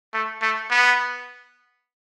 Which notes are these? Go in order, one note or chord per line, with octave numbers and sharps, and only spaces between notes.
A3
A3
B3